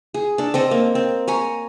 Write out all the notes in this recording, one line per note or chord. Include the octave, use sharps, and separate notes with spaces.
G#4
D4 A4
C4 A4 D#5
A#3
C4
C#5 G#5 A#5